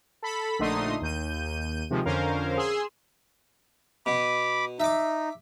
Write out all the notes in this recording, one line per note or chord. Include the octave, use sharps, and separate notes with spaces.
A4 B5 B6
A#1 D3 A3 D#4 C6 D#6
D#2 G6 D#7
C3 D#3 F3 G#3
F2 D3 C#4 A#4 C5 F5
G#4 C6 E6
B2 B5 D6
D#4 E5 D6